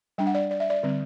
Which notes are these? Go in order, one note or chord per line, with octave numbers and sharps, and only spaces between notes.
G3 D4 G5
F#5
D5
D5
E5
D5
D3 G3 C4